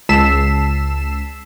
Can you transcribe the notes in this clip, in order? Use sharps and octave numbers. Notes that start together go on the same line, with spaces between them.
C#2 A5 E6 B6 C7 E7